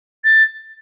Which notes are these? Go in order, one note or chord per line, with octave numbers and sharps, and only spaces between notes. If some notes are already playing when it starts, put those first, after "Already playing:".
A6